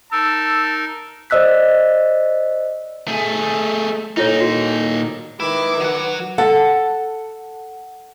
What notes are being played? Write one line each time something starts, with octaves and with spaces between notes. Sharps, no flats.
D#4 A#4 A5 E6
C5 D5 D#5 E6 F#6 B6
A3 G#4
A#2 D#4 E4 A4 C#5
F#4
D#3 E4 B4 D6
F#3 F#5
A4 F#5